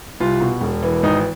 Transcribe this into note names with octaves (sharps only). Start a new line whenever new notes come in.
C2 F4
B2
E1
E3
G#1 D#4